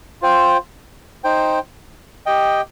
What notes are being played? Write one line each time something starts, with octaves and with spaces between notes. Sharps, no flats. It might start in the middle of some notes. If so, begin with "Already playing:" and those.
F4 C5 G5
D#4 C5 G5
G4 D#5 G5